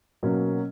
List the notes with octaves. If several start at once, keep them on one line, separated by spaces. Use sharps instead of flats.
B2 F#3 A#3 C#4